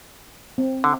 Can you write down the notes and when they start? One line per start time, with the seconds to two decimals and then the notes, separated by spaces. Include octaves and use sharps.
0.58 C4
0.84 D3